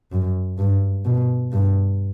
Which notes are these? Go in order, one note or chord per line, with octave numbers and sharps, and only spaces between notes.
F#2
G2
B2
G2